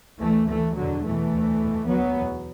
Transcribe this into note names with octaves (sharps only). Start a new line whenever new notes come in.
D2 E3 A3
D2 E3 A3
E2 B2 D3 F#3
E2 B2 E3 A3
D2
E2 B2
D2 F#3 B3
E2 B2